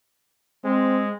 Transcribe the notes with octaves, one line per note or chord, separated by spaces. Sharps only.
G#3 C4